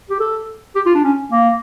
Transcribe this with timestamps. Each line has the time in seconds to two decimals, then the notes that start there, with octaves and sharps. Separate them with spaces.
0.10 G4
0.20 A4
0.76 G4
0.86 F4
0.95 D4
1.04 C#4
1.32 A#3